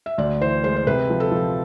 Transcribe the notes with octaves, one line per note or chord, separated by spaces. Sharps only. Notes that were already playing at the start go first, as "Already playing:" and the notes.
E5
D2 D5
E3 C5
G#3 C5
C5
C3 B4
F3
A4
F3